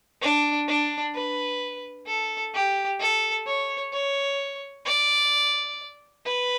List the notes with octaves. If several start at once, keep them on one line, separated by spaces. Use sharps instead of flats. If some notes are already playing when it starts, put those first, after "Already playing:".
D4
D4
B4
A4
G4
A4
C#5
C#5
D5
B4